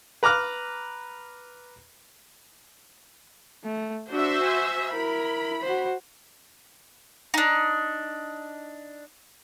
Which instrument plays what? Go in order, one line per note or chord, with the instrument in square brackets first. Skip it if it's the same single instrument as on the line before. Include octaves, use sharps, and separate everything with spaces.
[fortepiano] B4 A#5 D6 F6 F#6
[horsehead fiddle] A3
[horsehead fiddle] D4 [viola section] F#4 C5 E5
[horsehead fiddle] G#5
[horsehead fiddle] E4 A#4 [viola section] B5
[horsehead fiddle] F#4 C5
[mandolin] D4 D#4